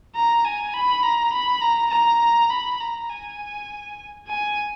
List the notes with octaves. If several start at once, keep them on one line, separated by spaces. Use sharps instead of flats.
A#5
G#5
B5
A#5
B5
A#5
A#5
B5
A#5
G#5
G#5